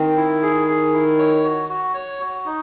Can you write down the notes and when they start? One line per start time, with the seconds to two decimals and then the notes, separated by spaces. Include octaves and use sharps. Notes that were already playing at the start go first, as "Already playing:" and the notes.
Already playing: D#3 C4
0.16 E4
0.42 G#4
0.68 G#4
0.93 E4
1.18 C#5
1.44 F#4
1.69 F#4
1.94 C#5
2.20 F#4
2.46 D#4